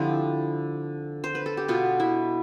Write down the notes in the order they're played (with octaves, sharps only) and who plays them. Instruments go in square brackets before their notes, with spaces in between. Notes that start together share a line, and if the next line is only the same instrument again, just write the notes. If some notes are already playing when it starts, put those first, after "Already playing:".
Already playing: [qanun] D3 F3 C4 E4 G4
C5
B4
A4
G4
B2 B3 D4 F4
E4